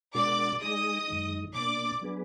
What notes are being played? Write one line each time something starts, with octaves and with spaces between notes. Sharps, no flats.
B2 G#3 D4 F#4 A#4 D5 D6
G#3 D#4 G#4 D#5 D#6
F#2 D#3 G#3 D#4
B2 A#3 D4 D5 D6
F#3 B3 D4 G#4 B4